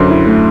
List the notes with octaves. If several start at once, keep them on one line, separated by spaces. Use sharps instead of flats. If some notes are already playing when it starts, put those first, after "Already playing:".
Already playing: F#2 D3 C5 C6
E4
A3